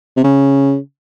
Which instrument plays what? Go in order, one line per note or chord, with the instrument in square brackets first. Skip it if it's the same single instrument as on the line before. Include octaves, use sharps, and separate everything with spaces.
[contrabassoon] C3
C#3